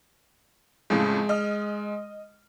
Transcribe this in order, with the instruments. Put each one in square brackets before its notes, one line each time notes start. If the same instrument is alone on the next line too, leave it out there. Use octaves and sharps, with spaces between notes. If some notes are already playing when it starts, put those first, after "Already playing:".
[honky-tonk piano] F2 A2 C#3 [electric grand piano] G#3
[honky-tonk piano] D#5 F6